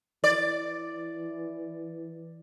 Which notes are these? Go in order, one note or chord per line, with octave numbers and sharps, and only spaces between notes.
E3 D5